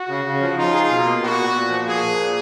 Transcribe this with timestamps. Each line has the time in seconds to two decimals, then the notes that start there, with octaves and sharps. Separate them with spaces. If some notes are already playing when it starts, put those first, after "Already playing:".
Already playing: F#4
0.09 C#3
0.25 C#3
0.41 F3
0.58 D#4 F4
0.74 G#4
0.89 B2
1.05 A#3
1.22 B3 F#4
1.38 A#2
1.54 A#2
1.69 F3
1.86 A#3 G#4
2.02 A#2
2.18 A#2